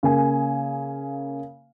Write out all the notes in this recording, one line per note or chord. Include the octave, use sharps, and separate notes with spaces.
C#3 A#3 G#5